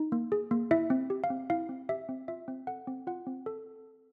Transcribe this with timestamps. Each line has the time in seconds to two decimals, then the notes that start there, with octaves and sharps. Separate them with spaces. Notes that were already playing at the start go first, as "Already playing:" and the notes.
Already playing: D#4
0.12 A#3
0.32 G#4
0.51 A#3
0.71 E4 E5
0.90 C4
1.10 G4
1.24 F5
1.30 C4
1.50 E4 F5
1.69 C4
1.89 G4 E5
2.09 C4
2.28 F4 E5
2.48 C4
2.67 A4 F#5
2.87 C4
3.07 F4 F#5
3.27 C4
3.46 A4